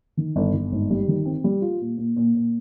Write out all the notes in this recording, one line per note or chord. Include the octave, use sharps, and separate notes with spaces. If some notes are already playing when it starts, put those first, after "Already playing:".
D#3
G1
G1
G#1
G3
D#3
C4
G3
F4
A#2
A#2
A#2
A#2